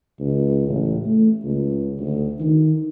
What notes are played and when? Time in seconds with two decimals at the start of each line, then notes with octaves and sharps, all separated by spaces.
0.20 C#2
0.68 A1
1.06 A3
1.44 C#2
1.99 D2
2.40 D#3